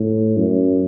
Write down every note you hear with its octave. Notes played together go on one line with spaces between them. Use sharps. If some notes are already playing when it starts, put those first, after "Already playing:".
Already playing: A2
F#2